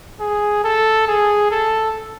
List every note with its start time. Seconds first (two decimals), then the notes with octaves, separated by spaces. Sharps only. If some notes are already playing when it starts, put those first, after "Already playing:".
0.20 G#4
0.64 A4
1.08 G#4
1.51 A4